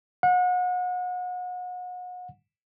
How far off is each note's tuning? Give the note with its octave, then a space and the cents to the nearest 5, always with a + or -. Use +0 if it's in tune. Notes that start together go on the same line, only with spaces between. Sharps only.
F#5 -35